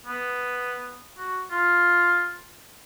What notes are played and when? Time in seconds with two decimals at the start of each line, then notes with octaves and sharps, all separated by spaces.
0.06 B3
1.19 F#4
1.51 F4